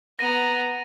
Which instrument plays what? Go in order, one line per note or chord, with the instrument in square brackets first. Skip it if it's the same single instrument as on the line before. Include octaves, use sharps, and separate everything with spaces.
[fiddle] B3 A#5 [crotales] A#6 D#7